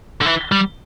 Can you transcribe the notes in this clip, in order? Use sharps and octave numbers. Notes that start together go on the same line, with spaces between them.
D3
E3
G3